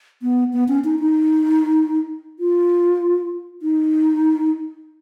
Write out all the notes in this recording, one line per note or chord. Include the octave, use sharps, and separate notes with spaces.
B3
B3
C#4
D#4
D#4
F4
D#4